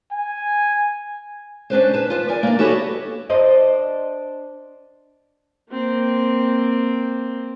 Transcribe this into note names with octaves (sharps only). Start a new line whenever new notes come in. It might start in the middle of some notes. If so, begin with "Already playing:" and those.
G#5
C#4 D4 B4 C5
B4 A5
F4 B4
A#4 D5 G#5
A#3 D4
F#4 G4 A4 B4 C#5 D#5
D4 C5 D#5
A#3 C4